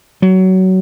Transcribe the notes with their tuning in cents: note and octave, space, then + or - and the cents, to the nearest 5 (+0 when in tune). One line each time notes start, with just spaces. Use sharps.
F#3 +20